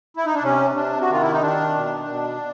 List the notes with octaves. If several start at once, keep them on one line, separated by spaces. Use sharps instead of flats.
E4
D#4
D4
C3 C#4
C3 D4
F#4
D#3 F4
E4
D#4
D#3 D4
B2
B2